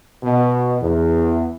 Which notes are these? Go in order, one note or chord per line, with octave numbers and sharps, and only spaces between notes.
B2
E2